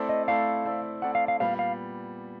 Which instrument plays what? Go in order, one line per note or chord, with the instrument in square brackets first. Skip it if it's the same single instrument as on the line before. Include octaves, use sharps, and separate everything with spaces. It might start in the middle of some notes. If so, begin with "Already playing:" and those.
Already playing: [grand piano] A3 C4 E4 A4 D5
[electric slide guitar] D#5
[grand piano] A3 C4 E4 A4 D5 [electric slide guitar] F5
[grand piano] A3 C4 E4 A4 D5
[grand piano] A3 C4 E4 A4 D5 [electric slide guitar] F#5
[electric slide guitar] F5
F5
[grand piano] A#2 G3 B3 [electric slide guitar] F5
[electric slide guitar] F5